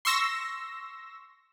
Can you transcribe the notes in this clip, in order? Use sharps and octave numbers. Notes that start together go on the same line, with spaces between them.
C6 C#6 E6 A#6